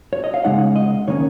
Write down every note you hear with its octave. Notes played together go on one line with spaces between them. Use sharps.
C#5
D#5
F5
C#3 G#3 D#4 F#5
D#5
D#3 A#3 C#4 C#5